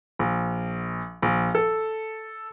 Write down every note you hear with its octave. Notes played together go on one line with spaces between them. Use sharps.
A#1
A#1
A4